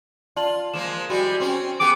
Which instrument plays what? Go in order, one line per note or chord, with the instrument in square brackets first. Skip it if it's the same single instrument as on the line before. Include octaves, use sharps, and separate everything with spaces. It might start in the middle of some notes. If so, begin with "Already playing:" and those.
[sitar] F4 [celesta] D5 A5 F#7
[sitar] F3 G#3 A#3 [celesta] E7
[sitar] G3 G#3 E4 [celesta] F#4
[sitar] C4 C#4
[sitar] B3 G4 G#4 [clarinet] D6